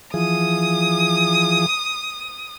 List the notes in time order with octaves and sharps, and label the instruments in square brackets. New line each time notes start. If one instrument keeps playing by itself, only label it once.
[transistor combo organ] E3 F3 G#4 [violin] D#6